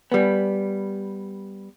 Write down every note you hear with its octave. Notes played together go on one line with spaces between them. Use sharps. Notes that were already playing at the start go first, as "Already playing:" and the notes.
G3 B3